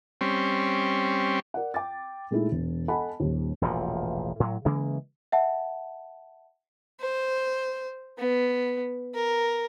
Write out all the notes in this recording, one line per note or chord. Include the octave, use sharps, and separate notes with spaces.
G3 C4 C#4
A#4 D5 F#5
G5 D6 A6
A#2 G#3 A3 D#4 E4
E1
A4 D#5 F#5 G#5 A5 B5
D#1 D#2
E1 A1 A#2 F3
A2 F#3
C#3 E3 G#3 A#3
E5 F#5 A5
C5
B3
A#4